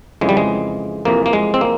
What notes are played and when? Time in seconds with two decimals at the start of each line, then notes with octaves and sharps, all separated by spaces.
0.21 F2 C#3 E3 G#3
0.29 G3
0.37 G#3
1.05 F2 C3 E3 A#3
1.26 A#3
1.33 G#3
1.54 C4
1.61 A#3